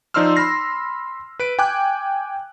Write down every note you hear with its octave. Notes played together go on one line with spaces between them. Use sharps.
F3 D#4 D5 C6 E6 F6
B5 C6 F6 A#6 C7
B4 D7
G5 G#5 D6 F#6